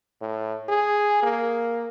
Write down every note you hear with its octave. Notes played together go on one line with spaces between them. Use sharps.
A2
G#4
A#3